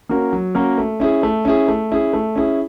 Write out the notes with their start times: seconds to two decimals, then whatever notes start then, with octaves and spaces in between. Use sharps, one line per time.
0.09 A#3 C#4 F#4 A#4
0.33 F#3
0.55 A#3 C#4 F#4 A#4
0.78 A3
1.00 C#4 E4 G#4
1.23 A3
1.45 C#4 E4 G#4
1.68 A3
1.91 C#4 E4 G#4
2.13 A3
2.36 C#4 E4 G#4